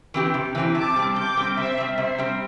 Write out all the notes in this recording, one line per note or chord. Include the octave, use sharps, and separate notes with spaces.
E3 C4 G4
C3
E3 C4 G4
C3 A5 D6
G3 C4
C3 D6 G6
G3 C4
C3 C5 E5
G3 C4
C3 C5 E5
G3 C4